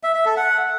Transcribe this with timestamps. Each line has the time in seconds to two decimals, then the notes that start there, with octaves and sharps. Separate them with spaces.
0.03 E5
0.14 E5
0.26 A4
0.37 F#5